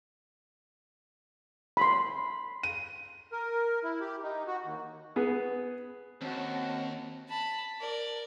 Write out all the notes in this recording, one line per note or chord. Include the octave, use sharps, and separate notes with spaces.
B5 C6
D#7
A#4
E4
G4
D#4
F#4
D#2
B3 G#4
D#2 C4 C#4 F#4 A5
A5 B5
A#4 D5